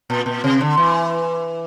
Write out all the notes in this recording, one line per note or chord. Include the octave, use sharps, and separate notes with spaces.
A#2
A#2
C3
D3
E3